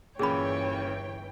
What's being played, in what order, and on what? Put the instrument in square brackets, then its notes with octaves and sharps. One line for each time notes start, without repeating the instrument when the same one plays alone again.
[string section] G1 E3 G5 [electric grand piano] A#2 C#4 [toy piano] G#4 B5 [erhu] C#5